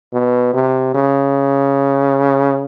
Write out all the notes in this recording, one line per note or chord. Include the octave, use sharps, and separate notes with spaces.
B2
C3
C#3